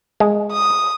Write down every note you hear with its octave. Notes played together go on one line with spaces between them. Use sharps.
G#3
D#6